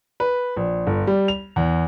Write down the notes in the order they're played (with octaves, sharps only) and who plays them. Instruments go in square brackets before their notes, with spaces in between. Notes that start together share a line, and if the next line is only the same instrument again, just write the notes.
[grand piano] B4
A#1
G1
G3
F7
E2